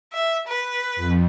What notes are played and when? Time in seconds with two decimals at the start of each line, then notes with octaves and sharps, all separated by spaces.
0.13 E5
0.48 B4
0.96 F2